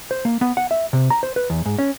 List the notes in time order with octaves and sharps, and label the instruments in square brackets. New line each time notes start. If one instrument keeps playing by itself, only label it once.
[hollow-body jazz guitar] C5
A#3
B3
F#5
E5
C3
A#5
C5
B4
E2
G#2
C#4